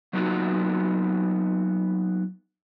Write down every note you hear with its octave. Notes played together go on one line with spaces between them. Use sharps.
F#3 A#3 B3 D#4 F4 F#4